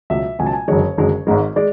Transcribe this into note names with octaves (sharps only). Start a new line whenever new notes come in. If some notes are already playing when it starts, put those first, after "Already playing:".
C#2 B2 F#3 E5
C#2 B2 F#3 G#5
A5
G#5
F#1 F#2 D3 G#3 C#5
F#1 F#2 D3 G#3
G#1 G#2 G#3
G#3 D5